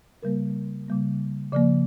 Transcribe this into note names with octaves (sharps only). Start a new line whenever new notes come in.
C#3 G3 A#3 A#4
C#3 G3 A#3
C#3 F3 A#3 D5